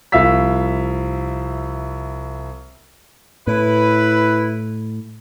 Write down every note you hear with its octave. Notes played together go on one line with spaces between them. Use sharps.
C2 F3 E5 F5 E6 B6
A2 E4 B4